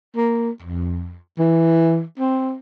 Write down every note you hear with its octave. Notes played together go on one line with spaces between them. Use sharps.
A#3
F2
E3
C4